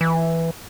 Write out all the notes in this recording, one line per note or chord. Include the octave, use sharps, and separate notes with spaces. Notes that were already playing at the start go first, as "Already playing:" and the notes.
E3